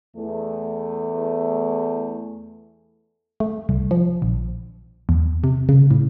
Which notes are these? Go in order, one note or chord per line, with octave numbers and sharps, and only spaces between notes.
E2 A3
A3
C2
F3
A#1
E2
C3
C#3
A2